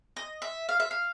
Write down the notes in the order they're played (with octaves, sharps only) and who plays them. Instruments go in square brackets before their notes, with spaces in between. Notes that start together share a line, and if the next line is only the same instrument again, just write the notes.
[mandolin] D#5
E5
F5
E5
F5